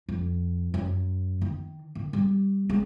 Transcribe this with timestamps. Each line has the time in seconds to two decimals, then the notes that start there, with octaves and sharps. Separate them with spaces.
0.09 F2
0.74 F#2
1.41 D#3
1.95 D#3
2.13 G3
2.69 G#3